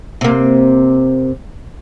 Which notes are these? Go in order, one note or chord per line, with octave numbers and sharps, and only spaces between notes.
C3 A#3